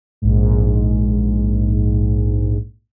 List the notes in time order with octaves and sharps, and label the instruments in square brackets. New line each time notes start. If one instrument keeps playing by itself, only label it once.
[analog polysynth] A#1 G#2